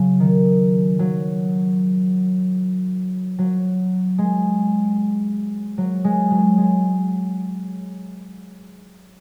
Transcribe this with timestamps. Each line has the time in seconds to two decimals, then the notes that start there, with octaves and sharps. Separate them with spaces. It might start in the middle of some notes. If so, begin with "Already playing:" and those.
Already playing: C#3 F#3
0.20 D#3
0.99 F#3
3.39 F#3
4.18 G#3
5.78 F#3
6.04 G#3
6.31 F#3
6.58 G#3